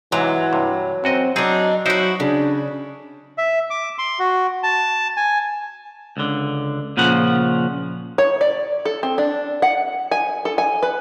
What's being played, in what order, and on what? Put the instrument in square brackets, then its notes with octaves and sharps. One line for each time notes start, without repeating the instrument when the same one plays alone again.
[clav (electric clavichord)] G#2 C3 [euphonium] E3 [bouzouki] F#3
[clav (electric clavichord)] G2 C3
[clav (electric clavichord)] F#2 F#4 D#5 [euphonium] C4
[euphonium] F#3 [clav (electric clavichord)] C4 G#4 [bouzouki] D4 D#4
[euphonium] F#3 [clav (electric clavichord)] D#4 C5 [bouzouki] E4 F#4
[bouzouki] C#3 [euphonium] D4
[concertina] E5
D6
C6
F#4
A5
G#5
[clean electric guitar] C#2 D3
A#2 C#3 F3 F#5
[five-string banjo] C#5
D5
A4
C4
D4
F#5
G#5
A4
G#5
B4